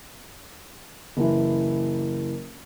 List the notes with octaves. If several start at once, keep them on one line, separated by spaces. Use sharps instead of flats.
F#1 E3